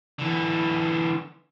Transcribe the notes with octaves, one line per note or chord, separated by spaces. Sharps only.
D3 E3